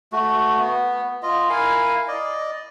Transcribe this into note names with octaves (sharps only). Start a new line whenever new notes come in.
A3 F#4
B3
F4 D#5
E4 A#4 F5 G#5
D5 D#5